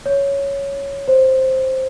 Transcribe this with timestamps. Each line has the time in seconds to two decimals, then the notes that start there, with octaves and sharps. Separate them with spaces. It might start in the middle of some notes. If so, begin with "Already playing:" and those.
0.06 C#5
1.08 C5